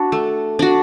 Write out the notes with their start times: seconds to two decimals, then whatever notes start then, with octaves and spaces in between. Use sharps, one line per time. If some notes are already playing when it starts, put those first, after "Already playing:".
Already playing: D4 F#4
0.12 A3
0.59 D4 F#4